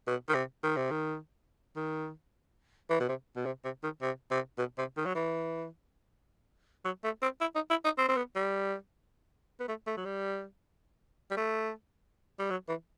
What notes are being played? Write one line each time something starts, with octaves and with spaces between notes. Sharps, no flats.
B2
D#3
C3
D#3
C3
D#3
D#3
E3
B2
C3
B2
C3
C3
D#3
C3
C3
B2
C3
D#3
F#3
E3
F#3
A3
C4
E4
D#4
E4
D#4
C4
C4
B3
G3
B3
A3
A3
F#3
G3
G3
A3
G3
F#3
E3